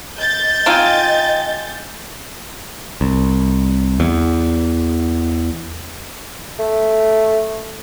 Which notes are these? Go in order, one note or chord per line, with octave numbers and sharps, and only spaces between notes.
D#5 G6 A6
C4 D#4 F4 D#5 G5 G#5
C2
E2
A3